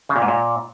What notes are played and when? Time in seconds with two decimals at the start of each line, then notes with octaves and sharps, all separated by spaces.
0.09 C#3
0.16 A#2
0.22 G#2
0.28 A#2